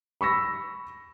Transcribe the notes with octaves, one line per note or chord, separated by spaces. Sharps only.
B5 C#6 E6 A#6